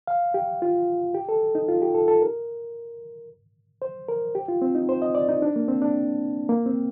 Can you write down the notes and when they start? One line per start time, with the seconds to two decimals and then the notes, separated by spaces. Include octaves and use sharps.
0.07 F5
0.34 G4
0.62 F4
1.15 G4
1.29 A4
1.55 D#4
1.68 F4
1.82 G4
1.95 A4
2.08 A4
2.22 A#4
3.82 C5
4.08 A#4
4.35 G4
4.48 F4
4.62 C4
4.75 D#4
4.89 C5
5.02 D#5
5.15 D5
5.28 D#4
5.42 D4
5.56 A#3
5.68 C4
5.82 D4
6.49 A#3
6.66 C4